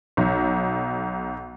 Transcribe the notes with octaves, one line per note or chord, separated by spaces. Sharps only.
B1